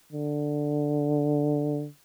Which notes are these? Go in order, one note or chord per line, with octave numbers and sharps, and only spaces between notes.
D3